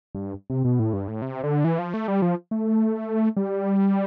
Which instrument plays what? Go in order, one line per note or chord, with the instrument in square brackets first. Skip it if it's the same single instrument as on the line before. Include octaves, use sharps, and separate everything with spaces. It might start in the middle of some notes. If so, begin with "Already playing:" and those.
[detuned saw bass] G2
C3
B2
A2
G2
A2
C3
D3
E3
F3
A3
G3
F3
A3
G3